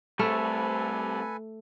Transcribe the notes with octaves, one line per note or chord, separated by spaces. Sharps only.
G3 A3 C4 A4 B4 G#5